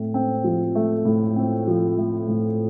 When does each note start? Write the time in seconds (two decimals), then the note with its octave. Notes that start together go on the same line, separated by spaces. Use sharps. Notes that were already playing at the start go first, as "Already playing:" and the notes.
Already playing: A2 A3 C4
0.14 C4
0.44 F3
0.75 A3
1.05 A2
1.36 C4
1.68 F3
1.98 A3
2.28 A2